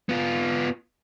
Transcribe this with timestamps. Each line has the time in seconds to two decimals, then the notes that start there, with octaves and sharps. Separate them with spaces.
0.09 B3 F4